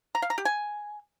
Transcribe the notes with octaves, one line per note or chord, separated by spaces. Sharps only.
A#5
F5
A#5
G4
G#5